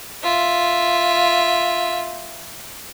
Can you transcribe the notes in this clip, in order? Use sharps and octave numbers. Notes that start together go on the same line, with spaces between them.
F4 E5